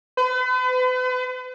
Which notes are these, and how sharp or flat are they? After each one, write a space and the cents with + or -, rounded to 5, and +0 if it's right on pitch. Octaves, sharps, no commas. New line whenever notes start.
B4 +40